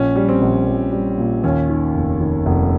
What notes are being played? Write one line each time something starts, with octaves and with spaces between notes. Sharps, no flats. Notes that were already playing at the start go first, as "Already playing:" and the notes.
Already playing: A#1 C#4
G3
C4
A#1
A#1
G3
A#2
D#2 C#4
D#3
F1
D#3
F1